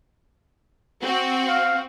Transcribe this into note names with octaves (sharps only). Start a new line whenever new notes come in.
C4 F#4
F5